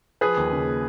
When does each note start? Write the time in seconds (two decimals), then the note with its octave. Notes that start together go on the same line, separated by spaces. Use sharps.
0.21 F3 G#4 B4
0.37 D#2
0.52 C#3